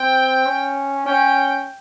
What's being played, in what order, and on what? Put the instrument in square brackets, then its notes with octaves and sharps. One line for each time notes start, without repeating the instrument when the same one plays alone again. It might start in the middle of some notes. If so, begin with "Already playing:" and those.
Already playing: [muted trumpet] C4 [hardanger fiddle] G5
[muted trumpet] C#4
[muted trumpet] C#4 [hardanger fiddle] G5